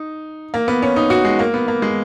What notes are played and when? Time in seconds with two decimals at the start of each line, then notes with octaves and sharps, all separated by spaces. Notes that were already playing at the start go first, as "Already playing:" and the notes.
Already playing: D#4
0.54 A#3
0.68 B3
0.82 C#4
0.96 D#4
1.10 F#4
1.25 G#3
1.39 A#3
1.54 B3
1.68 A#3
1.82 G#3